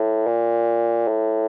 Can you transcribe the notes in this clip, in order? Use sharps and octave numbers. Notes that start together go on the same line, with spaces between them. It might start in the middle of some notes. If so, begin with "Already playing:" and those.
Already playing: A2
A#2
A2